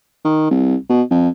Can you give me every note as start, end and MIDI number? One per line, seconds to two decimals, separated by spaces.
0.25 0.50 51
0.51 0.75 36
0.89 1.02 47
1.11 1.29 41